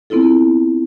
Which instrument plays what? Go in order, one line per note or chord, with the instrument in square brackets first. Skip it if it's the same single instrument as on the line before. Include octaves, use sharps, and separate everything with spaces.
[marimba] B3 C4 E4 F4 A4